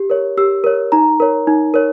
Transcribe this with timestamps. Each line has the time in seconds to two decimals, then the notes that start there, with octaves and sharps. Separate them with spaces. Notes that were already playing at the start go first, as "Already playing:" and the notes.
Already playing: G4
0.10 A#4 C#5
0.37 G4 E6
0.64 A#4 C#5
0.92 D#4 A#5
1.20 A#4 C#5
1.47 D#4
1.74 A#4 C#5